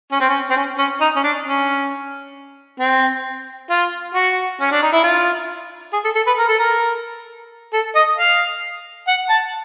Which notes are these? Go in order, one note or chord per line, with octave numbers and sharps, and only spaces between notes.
C#4
C4
C#4
C4
C#4
C#4
D#4
C#4
D4
C#4
C4
F4
F#4
C#4
D4
D#4
E4
F4
G#4
A4
A4
B4
A#4
A4
A#4
A4
D#5
F5
F#5
A5